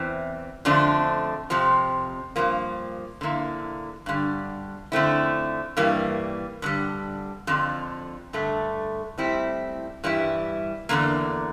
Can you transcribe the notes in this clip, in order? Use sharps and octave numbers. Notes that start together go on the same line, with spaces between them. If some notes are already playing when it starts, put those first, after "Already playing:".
Already playing: E2 E3 C4
F2 D3 F3 A3 D4
F2 C3 F3 C4
G2 F3 A#3
D3 F3 A#3 E4
G2 D3 G3
D3 F3 A3 C4 E4
G2 E3 G3 A#3
G2 D3 G3
F2 D3 F3
G2 D3 A3
A2 G3 C4 E4
G2 E3 G3 E4
E2 D3 F3 A#3